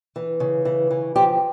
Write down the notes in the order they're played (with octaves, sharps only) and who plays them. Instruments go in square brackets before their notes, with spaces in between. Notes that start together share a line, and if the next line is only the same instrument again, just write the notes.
[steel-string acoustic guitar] E3
C#3
E3
E3
F3 G4